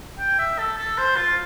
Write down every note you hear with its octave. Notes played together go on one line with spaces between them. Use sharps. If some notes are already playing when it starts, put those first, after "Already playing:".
G5
E5
A4
A4
C5
F4